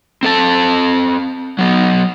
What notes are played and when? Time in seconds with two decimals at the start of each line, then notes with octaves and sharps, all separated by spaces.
0.23 C4 A4 A5
1.59 F#3 B3